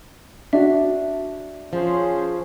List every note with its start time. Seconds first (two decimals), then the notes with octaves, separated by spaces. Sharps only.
0.53 D4 F#4 E5
1.73 F3 C#4 G#4 C5